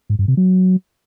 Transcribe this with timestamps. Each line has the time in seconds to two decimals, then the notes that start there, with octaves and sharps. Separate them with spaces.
0.10 G#2
0.19 G2
0.28 C3
0.37 F#3